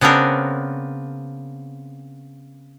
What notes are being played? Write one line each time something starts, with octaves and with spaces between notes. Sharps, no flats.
C#3 B3 C4 D4 A#4